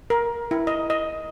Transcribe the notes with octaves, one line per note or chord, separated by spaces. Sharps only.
A#4
E4
D#5
D#5